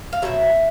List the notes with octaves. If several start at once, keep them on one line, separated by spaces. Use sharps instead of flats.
F5
B2 F#3 A3 C4 E5